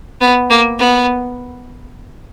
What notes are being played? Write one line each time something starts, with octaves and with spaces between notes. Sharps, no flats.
B3
A#3
B3